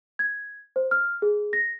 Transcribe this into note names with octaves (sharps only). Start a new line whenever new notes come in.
G#6
C5
F6
G#4
A#6